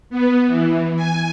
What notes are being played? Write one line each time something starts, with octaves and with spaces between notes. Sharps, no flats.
B3
E3
G#5